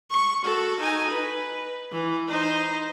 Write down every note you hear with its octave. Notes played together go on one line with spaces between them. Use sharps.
C#6
F#4 A4
D#4 G#5
B4
E3
D#4 C5